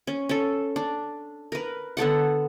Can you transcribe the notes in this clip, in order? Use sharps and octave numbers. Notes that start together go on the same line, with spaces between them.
C#4
C#4 A4
D4
A#4 B4
D3 B3 A4 F#5